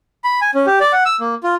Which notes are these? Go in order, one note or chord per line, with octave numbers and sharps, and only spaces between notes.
B5
G#5
C#4
G4
D5
F#5
E6
A#3
F4